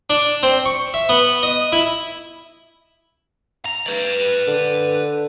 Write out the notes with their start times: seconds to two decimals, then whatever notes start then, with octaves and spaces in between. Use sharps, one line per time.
0.10 D4
0.43 C4
0.66 C#6
0.94 E5
1.09 B3
1.43 D#5
1.72 E4
3.66 A#5
3.87 B4 D5
4.48 D3